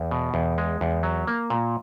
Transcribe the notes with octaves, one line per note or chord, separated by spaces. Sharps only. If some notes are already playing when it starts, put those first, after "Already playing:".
Already playing: E2
B2
E2
G#3
E2
F#3
A#3
A#2